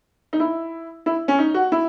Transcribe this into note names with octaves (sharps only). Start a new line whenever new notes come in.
D#4
E4
E4
C#4
D#4
F#4
E4